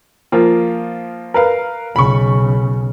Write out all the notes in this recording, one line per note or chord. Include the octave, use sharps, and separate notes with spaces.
F3 A#3 F4
A#4 B4 F5
B1 C#3 B5 C#6